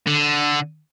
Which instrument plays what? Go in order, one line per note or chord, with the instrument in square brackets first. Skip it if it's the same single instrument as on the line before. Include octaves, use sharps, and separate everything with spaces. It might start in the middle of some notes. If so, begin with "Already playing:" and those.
[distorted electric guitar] D3